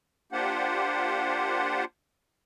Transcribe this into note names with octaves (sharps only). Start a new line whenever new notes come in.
A#3 D4 F4 G4 C5 F#5